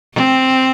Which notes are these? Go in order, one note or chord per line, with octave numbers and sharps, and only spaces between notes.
C4